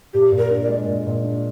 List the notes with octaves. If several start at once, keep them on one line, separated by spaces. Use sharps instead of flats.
A#2 G4
A#2
A#4
D4
D5
G#3
A#2
A#2
D4